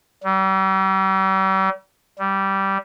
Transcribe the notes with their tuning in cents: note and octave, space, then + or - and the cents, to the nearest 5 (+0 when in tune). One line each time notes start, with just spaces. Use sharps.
G3 -40
G3 -10